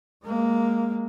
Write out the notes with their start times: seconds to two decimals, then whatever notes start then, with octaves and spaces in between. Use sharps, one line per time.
0.24 G#3 A#3